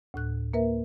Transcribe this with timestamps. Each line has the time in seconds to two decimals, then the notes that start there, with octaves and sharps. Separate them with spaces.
0.14 D2 A2 F#6
0.53 A#3 A#4 B4 E5